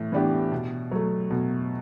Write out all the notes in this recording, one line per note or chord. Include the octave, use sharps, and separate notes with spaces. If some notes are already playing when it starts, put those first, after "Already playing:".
Already playing: A2 E3
E3 B3 D4 G4
B2
F#3 A3
B2